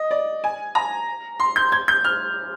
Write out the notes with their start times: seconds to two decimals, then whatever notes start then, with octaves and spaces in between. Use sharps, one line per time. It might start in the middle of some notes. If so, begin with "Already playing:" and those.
Already playing: D#5
0.11 D5
0.44 G#5
0.75 A#5
1.40 C6
1.56 G6
1.72 G#6
1.88 G6
2.04 F6